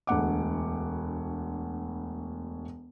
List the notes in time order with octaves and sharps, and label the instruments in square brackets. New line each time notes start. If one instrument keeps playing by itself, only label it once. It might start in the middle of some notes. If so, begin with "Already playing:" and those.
[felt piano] E1 D2 F#5 D6